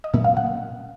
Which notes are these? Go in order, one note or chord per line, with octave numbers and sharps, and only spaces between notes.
D#5
A#2 F#3 A#3 C#4 E5
F5
F#5